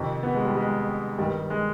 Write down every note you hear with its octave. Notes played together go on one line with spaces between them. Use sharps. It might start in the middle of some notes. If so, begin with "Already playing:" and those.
Already playing: F2 C3 D#3
B3
G#3
G3
G#3
G2 D#3 G3
G#3